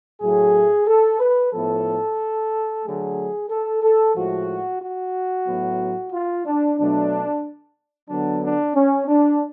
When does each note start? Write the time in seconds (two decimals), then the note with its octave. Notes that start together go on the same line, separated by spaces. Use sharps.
0.21 A2 F#3 A3 G#4
0.87 A4
1.19 B4
1.53 A2 F3 B3 A4
2.84 D3 F#3 A3 G#4
3.49 A4
3.82 A4
4.15 A2 F3 G#3 F#4
4.81 F#4
5.47 A2 F#3 B3
6.12 F4
6.46 D4
6.78 B2 F#3 A3 D4
8.10 D3 F#3 B3 D4
8.43 D4
8.75 C#4
9.08 D4